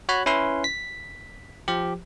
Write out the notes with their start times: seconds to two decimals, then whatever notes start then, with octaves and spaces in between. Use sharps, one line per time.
0.09 F#4 C#5 B5 F#6
0.26 C#4 E4 B4 C6
0.64 B6
1.68 F3 G4